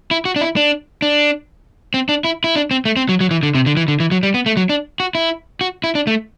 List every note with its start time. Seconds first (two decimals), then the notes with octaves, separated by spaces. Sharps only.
0.11 E4
0.25 F#4
0.36 D4
0.41 E4
0.56 D4
1.02 D4
1.94 C4
2.09 D4
2.25 E4
2.44 E4
2.56 D4
2.71 C4
2.85 A3
2.97 C4
3.09 F#3
3.21 F#3
3.31 E3
3.43 D3
3.55 C3
3.66 D3
3.77 E3
3.88 D3
4.00 E3
4.11 F#3
4.23 G3
4.34 B3
4.46 A3
4.57 F#3
4.69 D4
5.00 F#4
5.15 E4
5.61 F#4
5.84 E4
5.95 D4
6.07 A3